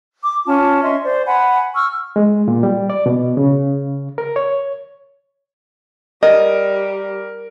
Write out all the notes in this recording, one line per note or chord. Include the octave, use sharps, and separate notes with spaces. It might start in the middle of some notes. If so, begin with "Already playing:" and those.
D6
C#4 F4 A5
C#4 D#5 E5 C6
C5 D5
F#5 G#5 B5
C#6 E6 F6
G#3
A#2
G3
D5
B2
C#3
A#4
C#5
G3 A#4 D#5